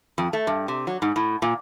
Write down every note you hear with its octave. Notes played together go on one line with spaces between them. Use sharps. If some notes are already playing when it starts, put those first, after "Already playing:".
F2
A3
G2
C3
F#3
G#2
A2
A#2